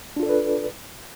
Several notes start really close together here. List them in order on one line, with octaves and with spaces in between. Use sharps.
D4 F4 A4 D5 B4